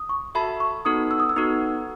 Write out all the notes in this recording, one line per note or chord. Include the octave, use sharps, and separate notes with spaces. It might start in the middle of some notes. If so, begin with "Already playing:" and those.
Already playing: D#6
C#6
F#4 A4 E5 A5 B5
C#6
B3 D#4 F#4 A4 D#6
E6
D#6
E6
B3 D#4 F#4 A4